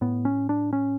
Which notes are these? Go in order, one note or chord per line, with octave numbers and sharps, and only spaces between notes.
A2 B3
C#4
D4
C#4